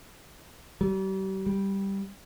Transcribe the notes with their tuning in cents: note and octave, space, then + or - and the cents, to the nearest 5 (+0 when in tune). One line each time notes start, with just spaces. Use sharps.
G3 -40
G3 +0